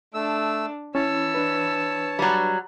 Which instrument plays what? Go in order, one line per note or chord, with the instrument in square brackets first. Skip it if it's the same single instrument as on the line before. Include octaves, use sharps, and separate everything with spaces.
[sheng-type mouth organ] A3 E6 [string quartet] D4
[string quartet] E3 E6 [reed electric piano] C#4 E4 [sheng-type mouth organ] C#5 A5
[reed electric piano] D4 B4
[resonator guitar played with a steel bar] F#3 G3